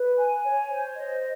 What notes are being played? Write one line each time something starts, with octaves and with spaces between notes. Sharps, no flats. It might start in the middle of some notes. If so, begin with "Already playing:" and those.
Already playing: B4
G#5
C#5
C5
D#5